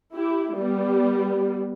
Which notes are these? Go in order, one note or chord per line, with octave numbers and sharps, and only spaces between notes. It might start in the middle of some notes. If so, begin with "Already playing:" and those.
E4 G4
G3 B3